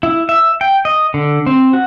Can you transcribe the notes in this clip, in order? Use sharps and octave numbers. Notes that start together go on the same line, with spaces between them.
E4
E5
G5
D#5
D3
C4
F#4